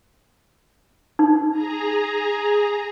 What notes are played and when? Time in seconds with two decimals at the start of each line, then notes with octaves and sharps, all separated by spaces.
1.19 D#4
1.51 G#4 A#5